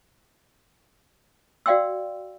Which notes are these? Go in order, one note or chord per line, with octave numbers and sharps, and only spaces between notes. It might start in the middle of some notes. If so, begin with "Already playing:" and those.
F#4 D5 F5 G5 C6 E6